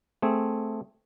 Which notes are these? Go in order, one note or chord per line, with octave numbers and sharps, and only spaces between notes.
A3 C4 G#4